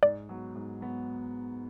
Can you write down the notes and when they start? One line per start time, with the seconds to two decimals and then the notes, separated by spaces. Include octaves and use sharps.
0.03 G#2 D5
0.29 F#3 B3
0.56 G#2
0.81 F#3 B3